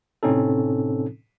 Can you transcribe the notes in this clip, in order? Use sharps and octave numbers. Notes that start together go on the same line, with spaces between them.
A2 C3 C4 C#4 D#4 A4